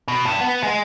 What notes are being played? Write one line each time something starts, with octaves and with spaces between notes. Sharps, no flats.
B2
G2
B3
G#3